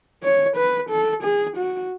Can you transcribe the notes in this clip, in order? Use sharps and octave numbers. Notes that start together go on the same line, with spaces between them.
C#5
B4
A4
G#4
F#4